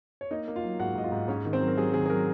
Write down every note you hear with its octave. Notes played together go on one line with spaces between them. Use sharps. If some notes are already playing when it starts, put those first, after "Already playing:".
C#5
A#3 D#4 D#5
A#3
F4 F5
F#3
G#2 F#4 F#5
G#2 D#5
F4 F5
G#2
G#2 C#4 C#5
D#3
C4 C5
F#3
A#4
F#3 G#4
D#3 G#4
G#4
F#3 A#4